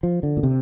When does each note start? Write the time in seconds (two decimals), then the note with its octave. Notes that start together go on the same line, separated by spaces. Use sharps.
0.03 F3
0.23 D3
0.37 A#2
0.43 C3